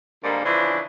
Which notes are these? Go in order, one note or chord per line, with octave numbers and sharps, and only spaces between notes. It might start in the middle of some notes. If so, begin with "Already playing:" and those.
G#2 D3 G3 A#3
C#3 E3 F3 D4 E4 C5